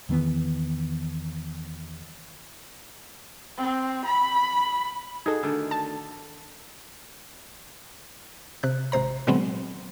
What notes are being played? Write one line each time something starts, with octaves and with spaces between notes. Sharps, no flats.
E2 D#3 E3 B3
C4
B5
D#4 F#4 G#4 A4
D3 D#3 A3
A5
C3 F#6
G#1 C3 C5 A#5
A#2 D3 F#3 G#3 B3 C4